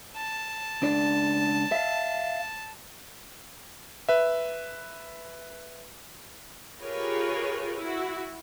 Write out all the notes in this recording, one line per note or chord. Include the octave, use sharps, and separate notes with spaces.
A5
C#2 D4 D5
E5 F5
B4 E5
F4 G4 G#4 A#4 B4 C#5
E4 F#4